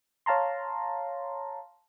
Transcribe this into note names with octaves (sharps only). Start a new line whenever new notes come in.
C#5 F5 A5 A#5 C6